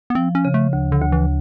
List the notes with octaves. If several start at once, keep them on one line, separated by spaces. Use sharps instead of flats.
B3
F3 C4
C#4
C#3
A3
D2
D3
D2
E3